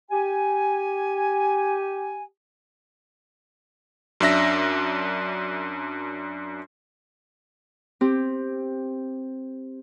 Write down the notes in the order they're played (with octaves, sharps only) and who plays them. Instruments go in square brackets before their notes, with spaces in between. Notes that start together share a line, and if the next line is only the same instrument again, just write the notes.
[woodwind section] G4 G#5
[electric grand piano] F#2 D4 E5 A#6
[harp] C4 G4